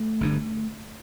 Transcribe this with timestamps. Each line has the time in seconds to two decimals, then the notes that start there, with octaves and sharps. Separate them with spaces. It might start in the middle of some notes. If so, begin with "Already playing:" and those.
Already playing: A3
0.21 G1 G2 D3